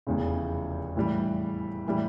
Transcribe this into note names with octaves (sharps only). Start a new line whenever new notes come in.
F1 E2 C#3
A2 E3 G3
A2 E3 G3